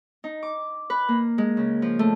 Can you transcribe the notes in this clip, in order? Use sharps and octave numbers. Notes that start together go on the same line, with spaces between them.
D#4
D6
B4
A#3
G#3
C#3
F3
A3